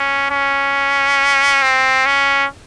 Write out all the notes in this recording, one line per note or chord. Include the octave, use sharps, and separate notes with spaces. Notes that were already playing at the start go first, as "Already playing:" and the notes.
Already playing: C#4
C#4
C4
C#4